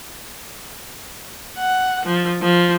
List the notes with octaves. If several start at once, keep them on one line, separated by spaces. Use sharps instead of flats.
F#5
F3
F3